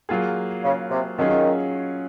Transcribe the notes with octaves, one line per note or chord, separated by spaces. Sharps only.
F#3 A#3 F4 G#4
C#3
C3
D#3 F#3 C#4 F4 G#4